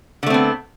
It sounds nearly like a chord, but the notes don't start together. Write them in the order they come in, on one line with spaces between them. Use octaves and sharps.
D3 A3 C4 B3